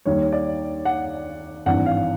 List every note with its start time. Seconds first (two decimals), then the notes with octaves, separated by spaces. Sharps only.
0.06 D#2 D#3 G3 C#5
0.32 D5
0.85 F#5
1.66 G#1 G2 E3 F#5
1.86 F5